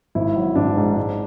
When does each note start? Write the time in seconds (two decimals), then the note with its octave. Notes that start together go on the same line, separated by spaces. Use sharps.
0.15 G#1 E4
0.36 F#3
0.55 G#1 D4
0.77 G#2
0.96 G#2